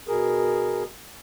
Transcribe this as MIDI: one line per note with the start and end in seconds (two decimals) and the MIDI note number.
0.08 0.83 47
0.08 0.83 68
0.08 0.83 70